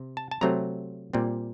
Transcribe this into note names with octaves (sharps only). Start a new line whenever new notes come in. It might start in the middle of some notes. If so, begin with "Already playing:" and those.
Already playing: C3
A5
A5
C3 F#3 A3 C4 A#5
A#2 G3 C4